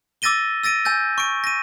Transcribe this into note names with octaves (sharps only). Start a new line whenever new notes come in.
D6 E6 A6 A#6 D#7 G7
E6 A6 A#6 D7 D#7
G#5 E6 G6 A6
C#6 D7
A#6 D#7